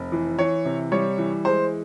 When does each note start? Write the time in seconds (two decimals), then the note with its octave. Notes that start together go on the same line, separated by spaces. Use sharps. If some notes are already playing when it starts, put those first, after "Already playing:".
Already playing: F1
0.12 E3
0.39 E3 C#5
0.65 C3
0.92 G3 C#5
1.18 E3
1.45 G#3 C5